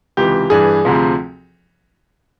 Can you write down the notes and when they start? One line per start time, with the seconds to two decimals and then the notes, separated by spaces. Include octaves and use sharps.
0.17 C#2 C3 E3 G4
0.50 G2 E3 G#4
0.85 D2 C3 F3